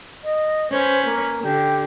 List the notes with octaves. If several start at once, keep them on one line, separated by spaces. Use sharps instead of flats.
D#5
C#4 B4 C5
A#3
D3 G4